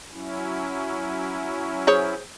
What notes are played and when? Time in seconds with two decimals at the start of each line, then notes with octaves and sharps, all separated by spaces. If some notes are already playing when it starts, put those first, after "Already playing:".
0.12 F#3 C#4 E4
1.87 G#4 C5 C#5